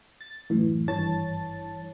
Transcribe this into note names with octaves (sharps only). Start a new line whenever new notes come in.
A6
F#2 A2 E3
G#1 G2 E3 C#5 A5 A6